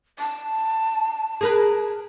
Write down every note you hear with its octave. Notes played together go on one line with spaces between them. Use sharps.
A5
G#4 A#4 B4